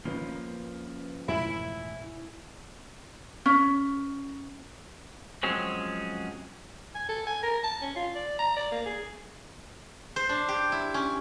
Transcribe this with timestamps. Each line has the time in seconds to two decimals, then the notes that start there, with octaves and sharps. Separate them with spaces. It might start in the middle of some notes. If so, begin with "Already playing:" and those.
0.05 D2 D#3 F3 A#3 C#4 B4
0.29 A#3
1.28 A1 F2 G#2 B2 E4 G#5
3.46 C#4
5.43 F3 F#3 G#3 C4 C#4
6.95 G#5
7.09 A4
7.27 G#5
7.43 A#4
7.63 A5
7.82 C#4
7.96 F4
8.15 D5
8.39 A#5
8.56 D5
8.72 A#3
8.86 G#4
10.16 C5
10.29 D4
10.49 G4
10.72 E4
10.94 C#4